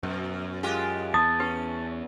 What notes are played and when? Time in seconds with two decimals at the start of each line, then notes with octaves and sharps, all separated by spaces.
0.03 F#2 B2
0.63 G#3 F4 G4
1.14 E2 A5 D#6
1.40 C#4 G4 B4